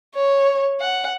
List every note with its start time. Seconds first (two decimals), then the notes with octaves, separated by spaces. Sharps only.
0.15 C#5
0.80 F#5